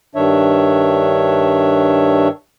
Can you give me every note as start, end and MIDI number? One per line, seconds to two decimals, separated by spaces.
0.15 2.28 43
0.15 2.28 51
0.15 2.28 62
0.15 2.28 73
0.15 2.28 76